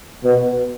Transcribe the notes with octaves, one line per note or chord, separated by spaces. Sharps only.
B2